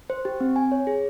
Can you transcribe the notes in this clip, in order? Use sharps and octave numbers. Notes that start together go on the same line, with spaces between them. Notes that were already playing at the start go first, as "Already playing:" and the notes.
C5
G4
C4
G#5
C#5
G#4